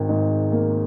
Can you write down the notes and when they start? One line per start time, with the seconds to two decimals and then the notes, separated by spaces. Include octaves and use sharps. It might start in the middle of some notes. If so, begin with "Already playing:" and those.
Already playing: G#1 D#3
0.09 G#2
0.52 A#3